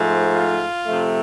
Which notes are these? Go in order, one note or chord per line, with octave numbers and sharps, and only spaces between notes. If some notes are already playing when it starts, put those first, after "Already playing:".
Already playing: G#2 F3 A3
F4
C3 F3 A3